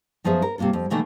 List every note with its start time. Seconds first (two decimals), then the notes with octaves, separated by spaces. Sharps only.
0.24 F#2 F3 B3 G#4 E5
0.42 A#4
0.58 C3 G3 A#3 F4 A4
0.73 F2
0.90 B2 D#3 E3 A3 A#3